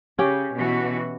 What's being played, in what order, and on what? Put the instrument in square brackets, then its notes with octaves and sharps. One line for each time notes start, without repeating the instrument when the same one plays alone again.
[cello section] C#3 [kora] C#4 G4 G5
[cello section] B2 E3 F#4